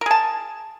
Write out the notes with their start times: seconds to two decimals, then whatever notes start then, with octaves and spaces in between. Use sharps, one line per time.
0.01 A#4
0.06 G#4
0.11 A5